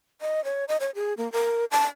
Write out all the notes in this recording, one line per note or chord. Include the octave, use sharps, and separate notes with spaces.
D#5
C#5
D#5
C#5
G#4
A#3
A#4
A5